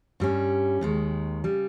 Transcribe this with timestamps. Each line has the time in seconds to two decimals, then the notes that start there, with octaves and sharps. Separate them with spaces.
0.20 G2 G3 C#4
0.81 D#2 D#3 G#3
1.44 C#3 G3